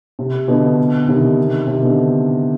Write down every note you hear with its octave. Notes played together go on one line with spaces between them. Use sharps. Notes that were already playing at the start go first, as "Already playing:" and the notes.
C3
B2 D3
C3 D#3
C3
B2 D3